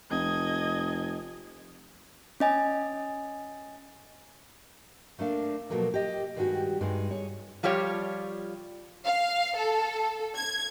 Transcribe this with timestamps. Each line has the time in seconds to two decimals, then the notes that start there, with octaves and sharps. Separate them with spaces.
0.11 F1 D#5 G#6
2.40 C#4 D#5 G#5
5.19 A3 A#3 D4 F5
5.70 B2 F3 F#3 A3 A#3
5.94 G4 D#5
6.36 G2 D#3 G#3 D#4 F#4 G4
6.81 G2 G#3 D#4
7.11 G#4 C#5
7.63 F3 G3 F4 G4 C#5
9.05 F5
9.56 A4
10.36 G#6